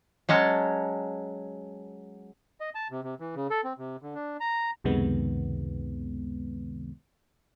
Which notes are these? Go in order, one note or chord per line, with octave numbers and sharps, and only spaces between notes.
F#3 G#3 C#4 A5
D#5
A5
C3
C3
E3
C#3
A4
C4
C3
D3
D4
A#5
C#2 F#2 C3 D#3 G#3 B3